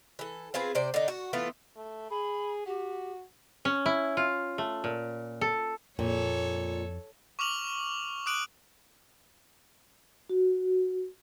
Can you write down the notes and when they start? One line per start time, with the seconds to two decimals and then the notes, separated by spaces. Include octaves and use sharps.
0.19 E3 A4
0.54 C4 F4 G#4 B4
0.75 C3 C5 D5
0.94 D3 D#4
1.08 F#4
1.33 E3 A3 B3 F4
1.77 A3
2.11 G#4 B5
2.66 F#4 G4
3.65 C#4
3.86 E4
4.17 F4
4.58 A3
4.84 A#2
5.41 A4
5.99 F2 A#2 A4 C#5
7.39 C#6 D6 F6 F7 F#7
8.26 D6 D#6 F#6 D7 D#7 F#7
10.30 F#4